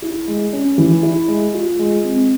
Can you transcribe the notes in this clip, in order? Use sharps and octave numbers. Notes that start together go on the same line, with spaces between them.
E4
G#3
C#4
E3
E4
G#3
F4
G#3
C4